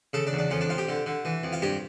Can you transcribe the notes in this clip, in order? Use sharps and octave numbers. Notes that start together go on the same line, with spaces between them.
C#3 A4
D4
E2
D4
F2 C#4
D4
F2 F4
G4
D3
D3
E3
F2
F4
G2 G4